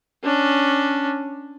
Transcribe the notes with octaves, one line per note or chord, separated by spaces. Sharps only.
C#4 D4